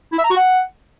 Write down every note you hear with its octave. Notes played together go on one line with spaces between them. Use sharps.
E4
E5
A#5
F#4
F#5